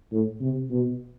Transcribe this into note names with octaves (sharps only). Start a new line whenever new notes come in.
A2
C3
B2